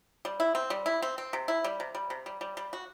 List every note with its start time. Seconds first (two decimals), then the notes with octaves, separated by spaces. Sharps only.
0.25 G3
0.40 E4
0.55 C4
0.70 G3
0.86 E4
1.02 C4
1.18 C4
1.33 C3
1.48 E4
1.64 G3
1.80 C3
1.95 G3
2.10 C3
2.26 G3
2.41 G3
2.57 G3
2.73 F#4